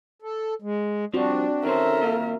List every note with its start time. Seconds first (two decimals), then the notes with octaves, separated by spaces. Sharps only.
0.22 A4
0.62 G#3
1.14 F3 G3 C4 D4 F#4
1.65 D#3 C#4 A4 A#4 C5 E5
2.02 D#2 A#2 F5